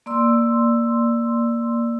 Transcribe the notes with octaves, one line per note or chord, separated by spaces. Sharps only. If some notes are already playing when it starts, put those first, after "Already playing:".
A#3 D5 C6 E6